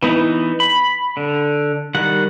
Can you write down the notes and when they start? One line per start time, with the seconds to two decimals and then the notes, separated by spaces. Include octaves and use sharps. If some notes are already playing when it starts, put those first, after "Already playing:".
0.02 E3 B3 D#4
0.60 B5
1.17 D3
1.95 D#3 G3 F#5